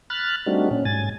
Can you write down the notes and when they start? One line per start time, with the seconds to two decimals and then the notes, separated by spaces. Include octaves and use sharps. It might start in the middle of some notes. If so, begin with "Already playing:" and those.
0.10 B5 F6 F#6 A6
0.46 G3 A3 C4 D4 D#4 F#4
0.71 A#2 C#4
0.85 G#2 G#5 A6